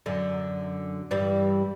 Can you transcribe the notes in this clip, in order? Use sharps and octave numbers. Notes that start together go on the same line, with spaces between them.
F#2 D3
G2 E3 G3